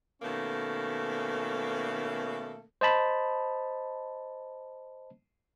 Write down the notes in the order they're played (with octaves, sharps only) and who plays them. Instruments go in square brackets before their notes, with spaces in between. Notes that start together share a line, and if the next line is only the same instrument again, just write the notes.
[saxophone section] B2 D#3 A3 A#3 C#4 A4
[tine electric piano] C5 D#5 A5 B5